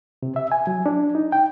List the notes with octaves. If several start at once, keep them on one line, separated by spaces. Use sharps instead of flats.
C3
E5
G#5
F#3
D4
D#4
G5